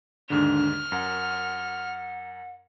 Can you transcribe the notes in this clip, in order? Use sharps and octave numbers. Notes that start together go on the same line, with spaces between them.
D#2 G#2 D3 D4 F6
F#2 A#4 F#5